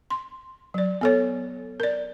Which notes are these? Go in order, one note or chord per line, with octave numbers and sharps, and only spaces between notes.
C6
F#3 D5
B3 A4 C#5
A#4 D5